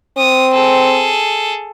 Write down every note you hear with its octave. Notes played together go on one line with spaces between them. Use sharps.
C4 D#6
G#4 A4